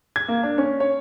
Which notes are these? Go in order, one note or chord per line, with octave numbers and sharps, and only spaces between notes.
G#6
A#3
D4
C#4
C#5